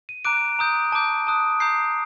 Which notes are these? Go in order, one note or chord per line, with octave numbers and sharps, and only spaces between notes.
D#7
A#5 D6 F#6 D7
A#5 D#6 G6
A5 D6 G6 D7
A5 D#6 F#6
A#5 D#6 G6 C7